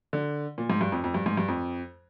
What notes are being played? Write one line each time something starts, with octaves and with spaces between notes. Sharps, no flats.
D3
A#2
G#2
G2
F2
F2
G2
G#2
G2
F2